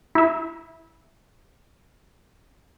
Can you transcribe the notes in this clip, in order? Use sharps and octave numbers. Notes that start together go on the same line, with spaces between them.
E4 E5